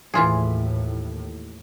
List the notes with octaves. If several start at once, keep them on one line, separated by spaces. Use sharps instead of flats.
D#2 A2 E3 F4 G#4